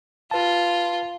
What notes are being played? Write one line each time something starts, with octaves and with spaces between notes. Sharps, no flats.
F4 B4 A5